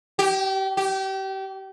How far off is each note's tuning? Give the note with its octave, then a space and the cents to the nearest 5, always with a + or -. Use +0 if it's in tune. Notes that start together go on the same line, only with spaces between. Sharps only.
G4 -30
G4 -30